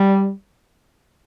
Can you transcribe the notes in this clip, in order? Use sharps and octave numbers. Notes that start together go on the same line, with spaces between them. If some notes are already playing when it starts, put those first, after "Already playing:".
Already playing: G3